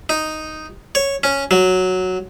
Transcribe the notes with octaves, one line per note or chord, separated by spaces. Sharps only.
D#4
C#5
C#4
F#3